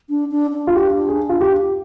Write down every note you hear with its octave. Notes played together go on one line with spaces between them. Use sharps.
D4
D4
D4
F4
G4
G#4
F4
G4